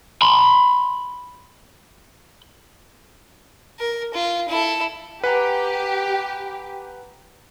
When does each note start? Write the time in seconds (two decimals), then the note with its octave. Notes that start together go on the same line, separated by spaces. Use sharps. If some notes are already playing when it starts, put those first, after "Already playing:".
0.22 B5 C6
3.79 A#4
4.14 F4
4.48 E4 A4
5.24 G4 B4 F#5 G#5 A#5